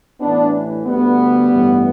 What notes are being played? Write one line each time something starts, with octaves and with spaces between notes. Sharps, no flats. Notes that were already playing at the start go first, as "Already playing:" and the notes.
A1 A2 E3 B3 D4
D2 D3 G3 B3
A1 G2 E3